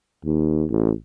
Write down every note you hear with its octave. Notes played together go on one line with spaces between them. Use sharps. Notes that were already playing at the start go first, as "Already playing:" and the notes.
D#2
A1